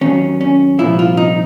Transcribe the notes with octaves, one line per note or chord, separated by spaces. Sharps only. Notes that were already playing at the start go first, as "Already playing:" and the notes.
D#2 D#3 F#3 C#4
C#4
C2 A#2 F3 E4
F4
D#4